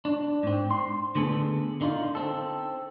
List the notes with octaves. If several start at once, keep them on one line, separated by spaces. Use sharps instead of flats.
D4
G#2 C4
C6
D3 A3 B3 G#4 A4
D3 D#4 F4
C4 A4